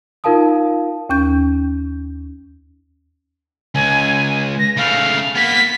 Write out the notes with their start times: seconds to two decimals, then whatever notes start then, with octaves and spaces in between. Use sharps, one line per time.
0.24 D#4 F4 A#4 F5 A5 D#6
1.09 D#2 C#4 G6
3.75 C#2 G#5
4.59 A#6
4.78 C#3 A3 F5
5.36 A#3 B3 B6